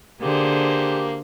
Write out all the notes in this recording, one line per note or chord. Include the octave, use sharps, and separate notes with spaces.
D3 A#3 G4 G#4 C5